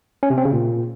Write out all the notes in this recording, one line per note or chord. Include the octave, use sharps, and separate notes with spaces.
C#4
C3
C4
C#3
A#2